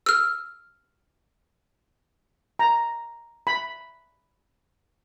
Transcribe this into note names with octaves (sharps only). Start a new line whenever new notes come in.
E6 F6
A#5
B5